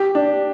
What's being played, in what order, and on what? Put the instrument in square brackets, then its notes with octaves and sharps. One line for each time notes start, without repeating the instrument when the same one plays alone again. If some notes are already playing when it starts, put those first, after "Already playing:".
Already playing: [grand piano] G4
D4